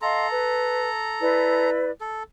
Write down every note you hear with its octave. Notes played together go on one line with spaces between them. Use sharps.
A4 D#5 F5 A#5 C6
B4
E4 B4 D5
A4